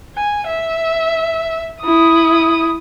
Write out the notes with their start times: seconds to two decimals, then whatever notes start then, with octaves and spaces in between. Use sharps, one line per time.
0.16 G#5
0.47 E5
1.82 E4 D#6